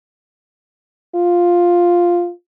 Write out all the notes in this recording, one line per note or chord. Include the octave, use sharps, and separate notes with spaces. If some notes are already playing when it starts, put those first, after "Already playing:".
F4